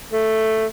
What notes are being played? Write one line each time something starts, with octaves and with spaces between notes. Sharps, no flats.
A3